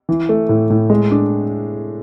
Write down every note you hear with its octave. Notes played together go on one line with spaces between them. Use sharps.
E3
A3
A2
A2
G#3
D4